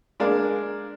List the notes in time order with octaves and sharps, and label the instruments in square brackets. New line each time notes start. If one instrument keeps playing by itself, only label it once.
[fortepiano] G#3 D4 A#4 F5